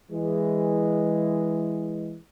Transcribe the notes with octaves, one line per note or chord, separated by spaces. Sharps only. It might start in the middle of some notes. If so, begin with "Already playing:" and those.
E3 G#3